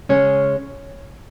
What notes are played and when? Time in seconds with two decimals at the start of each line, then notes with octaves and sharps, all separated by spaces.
0.09 C#3 G#3 C#4 G#4 C#5